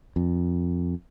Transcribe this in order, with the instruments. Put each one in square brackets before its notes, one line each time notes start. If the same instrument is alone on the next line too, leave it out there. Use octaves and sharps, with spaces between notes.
[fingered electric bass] F2